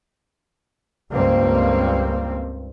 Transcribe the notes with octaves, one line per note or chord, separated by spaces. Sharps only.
C#2 G2 A#3 C4